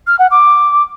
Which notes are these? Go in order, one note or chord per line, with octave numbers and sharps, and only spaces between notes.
F6
F#5
D6